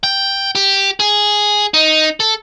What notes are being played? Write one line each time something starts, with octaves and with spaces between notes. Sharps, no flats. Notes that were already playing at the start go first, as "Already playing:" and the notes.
G5
G4
G#4
D#4
A4